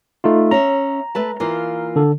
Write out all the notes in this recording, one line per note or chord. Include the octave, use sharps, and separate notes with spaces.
A3 D#4 F4
C#4 E5 A#5
A3 B4 A5
E3 A#3 F4
D3 A4